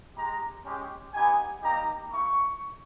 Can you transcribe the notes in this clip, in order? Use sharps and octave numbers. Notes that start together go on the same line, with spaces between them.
G#3 D#4 G4 A#5
G#3 C#4 G4
B3 D#4 G4 G#5
G3 A#3 D#4 G4 A#5
A#3 E4 G4 C#6